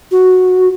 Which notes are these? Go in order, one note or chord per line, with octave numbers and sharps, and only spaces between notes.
F#4